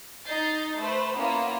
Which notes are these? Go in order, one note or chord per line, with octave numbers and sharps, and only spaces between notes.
D#4 D#5 G6 A6 C7
A3 B4 C5
A#3 B3 C#4 E4 F4